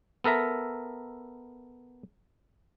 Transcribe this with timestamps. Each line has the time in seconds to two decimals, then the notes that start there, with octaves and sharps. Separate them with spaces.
0.24 B3 A4 A#4 E5 A#5